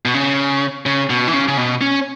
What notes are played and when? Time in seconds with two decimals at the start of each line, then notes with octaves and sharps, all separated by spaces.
0.05 B2
0.14 C#3
0.86 C#3
1.10 B2
1.28 E3
1.33 C#3
1.48 C#3
1.58 B2
1.81 C#4